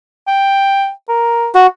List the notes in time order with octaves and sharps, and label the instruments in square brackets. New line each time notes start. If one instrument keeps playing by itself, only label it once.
[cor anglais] G5
A#4
[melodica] F#4